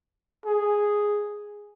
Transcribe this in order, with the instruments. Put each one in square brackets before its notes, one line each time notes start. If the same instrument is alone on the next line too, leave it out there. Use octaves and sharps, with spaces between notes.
[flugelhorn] G#4